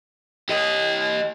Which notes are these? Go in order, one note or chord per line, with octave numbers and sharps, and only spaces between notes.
G4 D#5